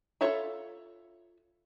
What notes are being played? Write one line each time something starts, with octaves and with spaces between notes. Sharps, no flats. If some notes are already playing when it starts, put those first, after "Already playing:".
F4 A4 C#5 E5 B5